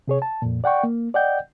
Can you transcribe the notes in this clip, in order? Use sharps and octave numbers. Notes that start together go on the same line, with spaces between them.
C3 G#4 C#5
A5
F2 A#2
D5 F#5 G5 C#6
A#3
D5 D#5 F#5 G5 G6